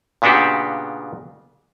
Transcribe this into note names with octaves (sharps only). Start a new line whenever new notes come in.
A#2 C#3 B3 D4 F#4 G4